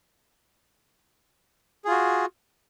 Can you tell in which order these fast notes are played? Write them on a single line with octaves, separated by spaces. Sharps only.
G#4 F4 F#4